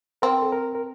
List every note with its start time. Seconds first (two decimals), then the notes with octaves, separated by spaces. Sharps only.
0.22 C4 A#4
0.42 A4
0.52 A#4
0.75 A#4